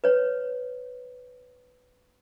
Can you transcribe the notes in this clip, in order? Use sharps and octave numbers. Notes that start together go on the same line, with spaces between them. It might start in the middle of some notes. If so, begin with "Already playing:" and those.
B4 C#5